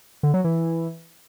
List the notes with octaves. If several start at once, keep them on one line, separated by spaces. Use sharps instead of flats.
D3
F#3
E3